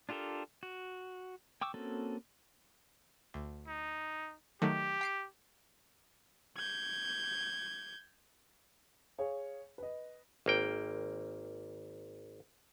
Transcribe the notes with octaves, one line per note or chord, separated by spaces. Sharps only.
D4 F4 G4 A4 A#4
F#4
G5 C#6 D6 E6
A#3 C4 C#4 F#4 A4
D2
D#4
D#3 F#3 A3 G4
G5 C7 D7
G6 G#6
G#4 C#5 F5
B4 D#5
G#1 A#3 G5